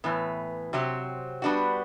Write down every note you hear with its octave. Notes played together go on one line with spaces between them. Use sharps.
A2 E3 B3
C3 F#3 C4 G4
G3 B3 D4 F#4